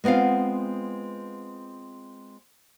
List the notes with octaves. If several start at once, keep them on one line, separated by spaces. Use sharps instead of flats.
G#3 B3 C4 F4 F5